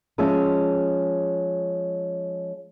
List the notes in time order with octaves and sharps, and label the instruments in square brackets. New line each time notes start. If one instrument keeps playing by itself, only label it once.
[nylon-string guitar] F3 G#3 C#4 E5